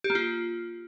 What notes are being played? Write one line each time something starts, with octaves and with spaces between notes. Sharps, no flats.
G4
A#3
F4